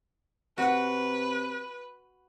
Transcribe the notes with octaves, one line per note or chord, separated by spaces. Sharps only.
C3 F#4 B4 F#5